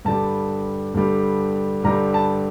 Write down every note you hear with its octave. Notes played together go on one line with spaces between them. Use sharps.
G2 D3 G3 A5
G2 D3 G3
G2 D3 G3 A#5
A5